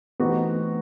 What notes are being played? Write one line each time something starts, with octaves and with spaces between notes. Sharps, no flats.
E3 A3 B3 C4 D#4 F#4